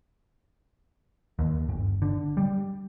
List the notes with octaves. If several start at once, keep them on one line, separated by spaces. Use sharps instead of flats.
D#2
G1
D3
G3